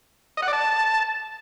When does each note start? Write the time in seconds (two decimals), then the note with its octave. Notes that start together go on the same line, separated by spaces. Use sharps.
0.37 D#5
0.42 F#5
0.48 D5
0.53 A5